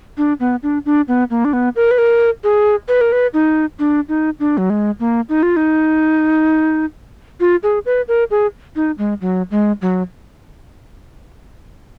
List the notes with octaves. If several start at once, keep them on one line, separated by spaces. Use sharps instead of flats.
D4
B3
D4
D4
B3
A#3
D4
B3
A#4
B4
A#4
G#4
B4
A#4
B4
D#4
D4
D#4
D4
F#3
G#3
A#3
D#4
F4
D#4
F4
G#4
B4
A#4
G#4
D#4
G#3
F#3
G#3
F#3